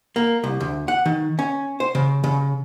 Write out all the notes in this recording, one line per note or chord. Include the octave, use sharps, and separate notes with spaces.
A#3
C2
D2
F#5
D#3
C#4
C5
C#3
C#3